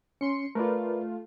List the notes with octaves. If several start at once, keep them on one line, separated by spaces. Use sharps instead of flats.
C#4 C6 C#7
A3 F4 A#4 B4 D5